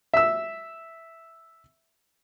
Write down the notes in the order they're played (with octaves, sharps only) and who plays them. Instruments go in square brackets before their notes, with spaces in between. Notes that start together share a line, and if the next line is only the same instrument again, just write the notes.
[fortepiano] E5 E6